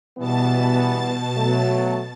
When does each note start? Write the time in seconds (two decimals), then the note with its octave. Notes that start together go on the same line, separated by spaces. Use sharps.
0.18 B2 E3 G3 B3 A5 A6
1.36 F#3 A3